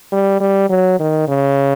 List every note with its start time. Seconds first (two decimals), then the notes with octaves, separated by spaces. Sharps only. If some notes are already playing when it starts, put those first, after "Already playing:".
0.12 G3
0.40 G3
0.70 F#3
1.00 D#3
1.28 C#3